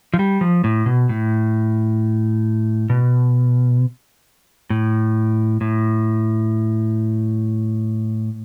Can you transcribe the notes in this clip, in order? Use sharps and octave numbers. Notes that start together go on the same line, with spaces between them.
F3
G3
F3
A2
B2
A2
B2
A2
A2